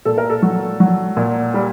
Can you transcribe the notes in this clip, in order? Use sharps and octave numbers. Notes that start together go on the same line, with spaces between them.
A#2 A4
A#4
A4
F#3
F#3
A#2
G3